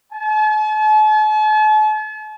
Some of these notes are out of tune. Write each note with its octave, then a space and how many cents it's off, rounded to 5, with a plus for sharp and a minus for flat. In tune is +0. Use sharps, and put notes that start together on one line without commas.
A5 -45